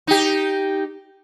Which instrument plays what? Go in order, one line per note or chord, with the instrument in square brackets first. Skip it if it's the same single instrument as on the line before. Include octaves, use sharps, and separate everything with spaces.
[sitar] D#4 G4